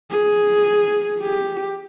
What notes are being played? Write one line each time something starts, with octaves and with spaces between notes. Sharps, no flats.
G#4
G4